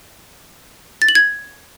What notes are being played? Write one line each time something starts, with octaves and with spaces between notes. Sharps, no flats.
A6
F#7
G#6